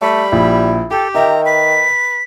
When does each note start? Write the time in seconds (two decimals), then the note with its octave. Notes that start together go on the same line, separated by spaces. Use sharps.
0.02 G3 A3 B5
0.32 A#1 E4
0.91 G4 A4 G5
1.15 D#3 E5 G5 A#5
1.46 B4 B6